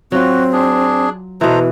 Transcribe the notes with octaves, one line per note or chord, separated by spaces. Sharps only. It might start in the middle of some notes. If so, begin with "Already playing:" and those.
F#3 C4 F4 F#4
D4 G#4
B2 E3 A4 B4 C5 A#5